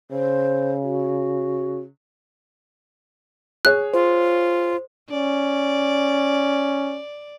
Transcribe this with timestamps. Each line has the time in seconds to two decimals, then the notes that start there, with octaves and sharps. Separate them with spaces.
0.11 C#3 C5
0.82 F#4
3.65 G#4 C#5 F#6
3.94 F4 C5
5.11 C#4 D5